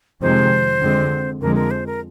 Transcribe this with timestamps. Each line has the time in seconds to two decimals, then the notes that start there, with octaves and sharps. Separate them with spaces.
0.22 F2 C3 D#3 G#3 C5
0.81 F2 D3 G#3 C4
1.41 F2 D3 F3 G#3 A#4
1.55 A#4
1.71 C5
1.87 A#4